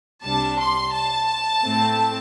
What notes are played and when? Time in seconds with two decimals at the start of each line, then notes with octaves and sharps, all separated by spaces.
0.24 C2 C3 G3 D4 A5
0.59 C6
0.93 A5
1.63 A2 A3 C4